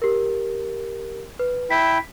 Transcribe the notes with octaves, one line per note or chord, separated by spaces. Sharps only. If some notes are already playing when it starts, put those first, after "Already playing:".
G4 A#4
B4
E4 G5 B6